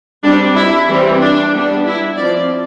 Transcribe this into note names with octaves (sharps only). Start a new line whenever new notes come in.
G3 C4 D4
E4
E3 G3 C4
D4
G3 B3 D4
E4
F3 C4 D5